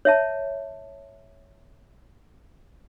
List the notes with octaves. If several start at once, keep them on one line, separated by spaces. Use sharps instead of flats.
C#5 E5 A5